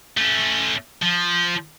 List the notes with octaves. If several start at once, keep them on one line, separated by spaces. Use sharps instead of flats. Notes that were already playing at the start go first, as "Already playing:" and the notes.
A3 C#4
F3